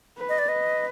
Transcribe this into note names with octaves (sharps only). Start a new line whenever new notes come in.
B4
D#5
D5
B4 D#5